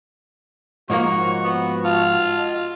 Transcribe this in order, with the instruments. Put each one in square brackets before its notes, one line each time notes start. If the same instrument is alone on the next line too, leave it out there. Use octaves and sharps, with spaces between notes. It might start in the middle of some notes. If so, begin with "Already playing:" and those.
[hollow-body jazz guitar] G#2 F3 A#3 [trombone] F#4 [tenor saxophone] C#5 [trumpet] C#6
[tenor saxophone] B3
[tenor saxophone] F4 [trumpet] A5
[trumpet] D#5